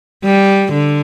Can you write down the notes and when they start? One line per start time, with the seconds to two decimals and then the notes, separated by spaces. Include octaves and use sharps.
0.24 G3
0.73 D3